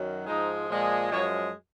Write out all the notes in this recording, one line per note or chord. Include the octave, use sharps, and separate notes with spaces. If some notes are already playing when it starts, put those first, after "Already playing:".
Already playing: F#2 D#3 F#3
G#2 F3 G#3 D#4
A#2 F3 G#3
F#2 F3 G#3 C#5